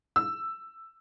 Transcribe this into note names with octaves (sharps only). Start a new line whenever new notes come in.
E6